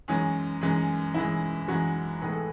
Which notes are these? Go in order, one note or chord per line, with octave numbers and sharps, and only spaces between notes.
F#2 E3 G#3 C#4
F#2 E3 G#3
F#2 E3 G#3 E4
F#2 E3 G#3 F#4
A2 E3 G#3 B3 G#4
A4